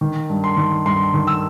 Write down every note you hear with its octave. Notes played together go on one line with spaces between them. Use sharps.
D#3
G2
C6
D#3
G2 C6
D#3
E6